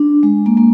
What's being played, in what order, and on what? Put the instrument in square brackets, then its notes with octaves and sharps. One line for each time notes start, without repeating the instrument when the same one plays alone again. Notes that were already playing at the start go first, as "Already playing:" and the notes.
Already playing: [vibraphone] D4
G#3
A#3
A#3